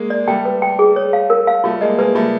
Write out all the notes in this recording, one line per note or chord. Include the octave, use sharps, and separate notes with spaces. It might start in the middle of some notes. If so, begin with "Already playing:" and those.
Already playing: G#3 A#3
D5
G3 A3 G5
B4
G5
G#4
C#5
F5
A#4
F5
G3 A3 F4
G#3 A#3 D#5
G#3 A#3 B4
G3 A3 F4